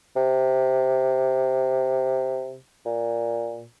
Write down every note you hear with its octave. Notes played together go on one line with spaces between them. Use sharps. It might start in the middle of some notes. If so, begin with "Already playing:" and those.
C3
A#2